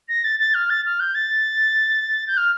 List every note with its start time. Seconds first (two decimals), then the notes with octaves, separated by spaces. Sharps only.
0.08 A#6
0.24 A6
0.39 A6
0.54 F6
0.69 A6
0.85 F6
1.00 G6
1.14 A6
2.27 G6
2.37 F6